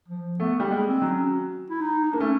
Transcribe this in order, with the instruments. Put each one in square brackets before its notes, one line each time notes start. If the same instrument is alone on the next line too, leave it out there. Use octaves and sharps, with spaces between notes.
[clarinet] F3
[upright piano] A3 [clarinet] B3
[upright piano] G3 [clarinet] A#3
[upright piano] G#3
[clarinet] C4
[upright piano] F#3
[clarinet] C#4
E4
D#4
D#4
[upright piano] A#3 [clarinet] D4
[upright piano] A3 [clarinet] C#4